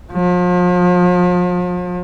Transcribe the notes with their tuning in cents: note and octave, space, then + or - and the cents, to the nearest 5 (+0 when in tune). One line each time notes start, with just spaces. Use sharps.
F3 +40